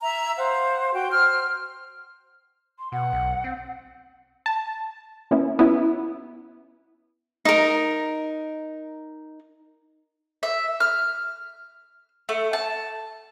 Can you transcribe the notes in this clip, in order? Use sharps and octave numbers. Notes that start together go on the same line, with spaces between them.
E5 A#5
C5 F5 F#5
F#4 G5
C5 F6
C6
B2 F#5
B1
C4
A5
A#3 B3 C#4 E4
B3 C#4 E4
D#4 A#4
E5
F6
A3
A5